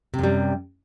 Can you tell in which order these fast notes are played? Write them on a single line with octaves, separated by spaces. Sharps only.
C3 F#2 G3